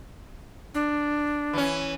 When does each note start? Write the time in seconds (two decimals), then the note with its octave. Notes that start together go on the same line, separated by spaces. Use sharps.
0.74 D4
1.53 E3 C#4